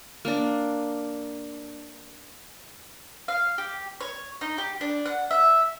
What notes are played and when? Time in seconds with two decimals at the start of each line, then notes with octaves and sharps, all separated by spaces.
0.25 A#3 D4
3.28 F5
3.58 G4
4.01 C#5
4.41 D#4
4.58 G4
4.81 D4
5.06 F#5
5.31 E5